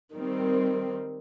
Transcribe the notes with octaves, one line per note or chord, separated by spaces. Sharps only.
D#3 G3 C4